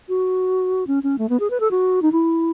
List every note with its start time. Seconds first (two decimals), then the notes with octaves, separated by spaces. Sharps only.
0.09 F#4
0.87 C#4
1.03 C#4
1.18 A3
1.29 B3
1.40 G#4
1.50 B4
1.60 A4
1.71 F#4
2.02 D#4
2.12 E4